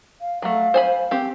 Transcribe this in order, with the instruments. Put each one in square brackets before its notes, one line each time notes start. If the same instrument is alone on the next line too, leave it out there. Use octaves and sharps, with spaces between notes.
[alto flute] F5
[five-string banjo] F#3 A3 [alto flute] F5
[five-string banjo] C5 G#5 B5
C4 G4